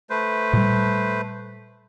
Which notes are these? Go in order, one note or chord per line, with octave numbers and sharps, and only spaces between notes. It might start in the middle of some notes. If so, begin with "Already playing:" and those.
A3 B4 C5
A#2 G3